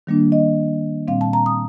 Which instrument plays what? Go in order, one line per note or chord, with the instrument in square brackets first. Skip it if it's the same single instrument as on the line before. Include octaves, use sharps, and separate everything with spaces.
[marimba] D#3 G3 A#3 D4
D#5
A#2 G3 C4 F5
A5
A#5
D#6